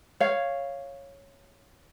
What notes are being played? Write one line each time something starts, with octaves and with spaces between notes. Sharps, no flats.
C#5 F5